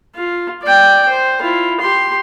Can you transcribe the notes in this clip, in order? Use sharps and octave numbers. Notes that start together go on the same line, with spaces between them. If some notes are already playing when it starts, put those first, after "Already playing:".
F4
D5 G5
C5
E4 F4
G4 C6